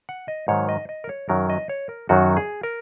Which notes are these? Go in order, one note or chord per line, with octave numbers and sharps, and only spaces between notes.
F#5
D#5
G#2 D#3 F#3 C#5
D#5
D#5
A#4
C#5
F#2 D#3 F#3 A#4
D#5
C#5
A#4
F#2 D#3 F#3 F#4
G#4
A#4